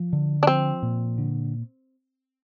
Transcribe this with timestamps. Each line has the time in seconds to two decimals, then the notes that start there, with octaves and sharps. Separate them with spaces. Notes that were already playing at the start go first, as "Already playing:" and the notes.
Already playing: F3
0.13 D3
0.43 D4
0.47 F3 C4
0.82 A#2
1.18 D3